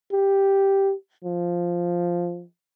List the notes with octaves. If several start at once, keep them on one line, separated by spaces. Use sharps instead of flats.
G4
F3